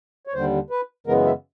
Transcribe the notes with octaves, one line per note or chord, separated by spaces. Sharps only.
C#5
D#2 D3 G3 C5
B4
F#2 C#3 E3 G#3 B3 A#4
E5